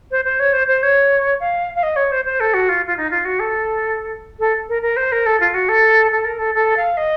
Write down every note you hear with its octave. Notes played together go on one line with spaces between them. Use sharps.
C5
C5
C#5
C5
C5
C#5
F5
F5
D#5
C#5
C5
C5
A4
F#4
F4
F4
D#4
F4
F#4
A4
A4
A#4
A#4
C5
A#4
A4
F4
F#4
A4
A4
A#4
A4
A4
F5
D#5